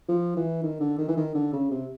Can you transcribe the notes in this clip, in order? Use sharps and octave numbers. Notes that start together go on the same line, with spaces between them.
F3
E3
D#3
D3
D#3
E3
D#3
D3
C#3
C3